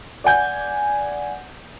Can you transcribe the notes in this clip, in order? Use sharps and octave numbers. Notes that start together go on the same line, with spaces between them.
D5 F#5 G#5 G6